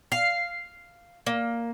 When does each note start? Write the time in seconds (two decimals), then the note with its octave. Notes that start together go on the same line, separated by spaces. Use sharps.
0.12 F5
1.27 A#3